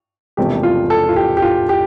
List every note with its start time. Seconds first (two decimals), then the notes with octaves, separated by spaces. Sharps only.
0.37 E1 E2 C3 F3 A3 G4
0.63 F4
0.90 A4
1.09 F4
1.16 G4
1.37 G4
1.42 F4
1.69 G4